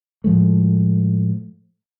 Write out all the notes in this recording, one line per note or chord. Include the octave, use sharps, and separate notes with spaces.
A2 F3 G#3 A3